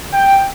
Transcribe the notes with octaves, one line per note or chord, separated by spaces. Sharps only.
G5